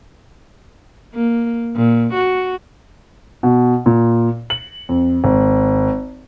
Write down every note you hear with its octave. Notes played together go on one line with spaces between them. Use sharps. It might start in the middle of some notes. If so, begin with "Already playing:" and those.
A#3
A#2
F#4
B2
A#2
F#7
F2
G#1